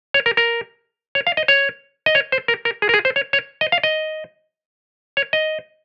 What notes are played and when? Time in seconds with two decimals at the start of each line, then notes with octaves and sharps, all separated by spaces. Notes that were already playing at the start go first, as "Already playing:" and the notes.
0.14 C#5
0.26 A#4
0.37 A#4
1.15 C#5
1.27 F5
1.37 D#5
1.48 C#5
2.06 D#5
2.15 C#5
2.32 C5
2.48 A#4
2.65 A#4
2.82 G#4
2.89 A#4
2.94 G#4
3.05 C5
3.16 C#5
3.33 C#5
3.61 D#5
3.72 F5
3.83 D#5
5.17 C#5
5.33 D#5